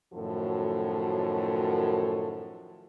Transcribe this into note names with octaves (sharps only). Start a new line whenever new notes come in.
F#2 A2 D#3 F3 F#4 A4